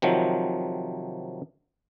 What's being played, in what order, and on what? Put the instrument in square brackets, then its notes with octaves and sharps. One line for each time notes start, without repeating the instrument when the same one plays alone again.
[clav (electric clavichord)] C3 D#3 F3 F#3